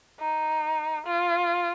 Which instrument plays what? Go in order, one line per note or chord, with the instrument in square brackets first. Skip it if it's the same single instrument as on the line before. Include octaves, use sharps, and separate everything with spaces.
[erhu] D#4
F4